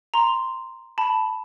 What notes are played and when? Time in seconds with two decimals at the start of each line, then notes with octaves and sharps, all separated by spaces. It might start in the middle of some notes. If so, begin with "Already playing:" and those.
0.14 A#5 C6
0.98 A5 B5